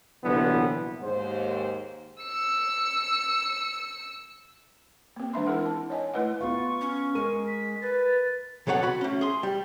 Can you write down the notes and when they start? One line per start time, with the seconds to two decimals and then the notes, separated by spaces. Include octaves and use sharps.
0.24 C2 A#2 D3 E3 F#3 B3
1.02 D#2 G#2 C5
2.23 E6 C#7
5.16 A#3 C4
5.33 E3 G#3 D4 E5 B5 C6
5.47 D#4 E4 G#4 A#4 F#5
5.66 A5
5.90 C#5 D#5 G#5
6.14 A3 E4 B4 D#5 F#5
6.41 B3 F4 F5 C#6
6.81 C#4
7.15 G#3 A#4 D#7
7.47 B6
7.82 B4 A6
8.67 B1 F#3 A4 C#5 F#5
8.83 F#4 B5
9.01 A3 C#4
9.21 G#4 C6
9.43 G3